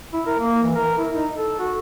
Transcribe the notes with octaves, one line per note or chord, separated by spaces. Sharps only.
E4
A#4
A#3
E3
A#4
E4
D#4
A4
F#4